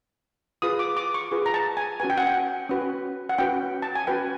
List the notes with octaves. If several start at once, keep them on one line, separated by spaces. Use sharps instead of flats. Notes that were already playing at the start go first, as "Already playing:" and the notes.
F4 G#4 B4 D#6
D6
D6
C#6
F4 G#4 B4
A#5
A5
G#5
C#4 F#4 B4 G#5
G5
F#5
G5
C#4 F#4 B4
F#5
C#4 F#4 B4 G5
A5
G#5
C#4 F#4 B4 G5